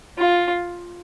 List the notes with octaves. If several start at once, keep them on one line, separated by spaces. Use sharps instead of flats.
F4